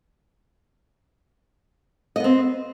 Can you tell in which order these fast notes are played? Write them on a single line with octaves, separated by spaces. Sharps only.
D#5 B3 C4